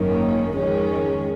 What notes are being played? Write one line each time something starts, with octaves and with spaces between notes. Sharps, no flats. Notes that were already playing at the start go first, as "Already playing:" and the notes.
Already playing: G#1 F#2 D#3 A#3 C#4
F2 D#3 G#3 C#4